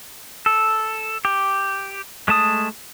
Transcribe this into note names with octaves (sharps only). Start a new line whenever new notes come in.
A4
G4
G#3 A3 A5 D#6